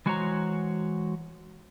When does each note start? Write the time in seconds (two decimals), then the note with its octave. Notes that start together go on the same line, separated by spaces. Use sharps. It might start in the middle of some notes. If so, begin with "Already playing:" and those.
0.06 E3 G#3 F#4 C5 C#5 A#5